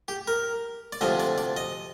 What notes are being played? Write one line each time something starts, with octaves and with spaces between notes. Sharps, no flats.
G4
A#4
D5
D2 C3 F3 D#5
D5
D5
D#5